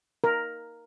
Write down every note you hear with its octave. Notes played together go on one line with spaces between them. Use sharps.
A#4